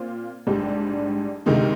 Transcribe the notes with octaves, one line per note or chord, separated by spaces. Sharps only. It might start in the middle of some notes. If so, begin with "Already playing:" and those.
Already playing: A#2 C4 F4
A#1 G#2 G3 D4 G4
D2 C3 D#3 G#3 D#4